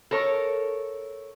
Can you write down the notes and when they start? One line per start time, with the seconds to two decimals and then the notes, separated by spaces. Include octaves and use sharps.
0.11 A4 A#4 C#5